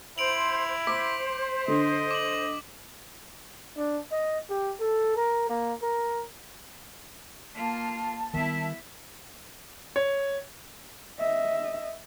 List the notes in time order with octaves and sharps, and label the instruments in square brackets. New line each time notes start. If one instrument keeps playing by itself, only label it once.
[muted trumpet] E4 [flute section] C5 [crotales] D7 F7 F#7
[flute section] C5 [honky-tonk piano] D6 [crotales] B6
[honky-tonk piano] D3 [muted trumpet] D#5
[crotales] D6 F#7
[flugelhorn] D4
D#5
G4
A4
A#4
A#3
A#4
[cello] A#3 F4 [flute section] A5
[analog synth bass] D#3 [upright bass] G3 B3 [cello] E4 E5
[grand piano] C#5
[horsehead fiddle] D#5 E5